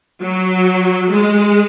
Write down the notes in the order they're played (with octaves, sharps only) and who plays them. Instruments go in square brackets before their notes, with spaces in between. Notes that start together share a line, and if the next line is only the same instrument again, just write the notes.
[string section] F#3
G#3